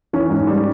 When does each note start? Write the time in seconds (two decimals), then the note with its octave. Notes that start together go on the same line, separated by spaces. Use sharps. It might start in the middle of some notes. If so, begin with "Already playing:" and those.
0.13 E3 C#4
0.30 G#2
0.47 G3